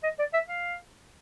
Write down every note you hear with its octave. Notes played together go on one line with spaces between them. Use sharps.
D#5
D5
E5
F5